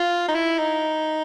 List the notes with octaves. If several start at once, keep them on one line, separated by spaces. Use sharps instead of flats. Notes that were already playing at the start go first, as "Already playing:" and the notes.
Already playing: F4
D#4
E4
D#4